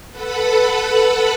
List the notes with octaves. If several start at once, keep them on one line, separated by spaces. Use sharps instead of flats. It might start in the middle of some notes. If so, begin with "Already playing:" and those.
A4 B4 F#5 B5